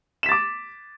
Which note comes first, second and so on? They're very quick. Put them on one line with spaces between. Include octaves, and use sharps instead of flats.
E7 B6 A6 D6